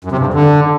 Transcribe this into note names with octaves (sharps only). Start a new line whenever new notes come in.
F#2
C3
G2
F2
D3